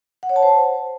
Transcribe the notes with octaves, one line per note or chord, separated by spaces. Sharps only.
F#5
C#5
A5
C5